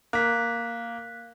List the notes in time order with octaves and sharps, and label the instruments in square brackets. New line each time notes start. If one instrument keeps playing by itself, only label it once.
[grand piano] A#3 [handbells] F#6 B6